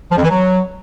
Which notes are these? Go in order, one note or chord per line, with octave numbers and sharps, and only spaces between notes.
F3
F2
E3
F#3